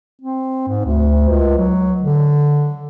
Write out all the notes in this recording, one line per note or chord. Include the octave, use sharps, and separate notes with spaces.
C4
G#2
D2
C#2
F#3
D3